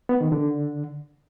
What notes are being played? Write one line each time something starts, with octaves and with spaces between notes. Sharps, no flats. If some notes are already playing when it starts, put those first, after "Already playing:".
B3
D#3
D3